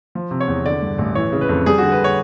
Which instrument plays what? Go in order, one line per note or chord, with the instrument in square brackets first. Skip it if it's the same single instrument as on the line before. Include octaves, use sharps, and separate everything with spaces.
[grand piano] F3
C3
C#5
E2
D3 D5
G2
A1
E3 C#5
C#3
B4
F2
G3 G#4
F#4
D3
B4
C#5